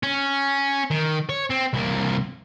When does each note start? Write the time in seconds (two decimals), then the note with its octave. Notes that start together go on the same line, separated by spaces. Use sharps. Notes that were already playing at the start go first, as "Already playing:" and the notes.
0.03 C#4
0.91 D#3
1.29 C#5
1.50 C4
1.73 C2 A#3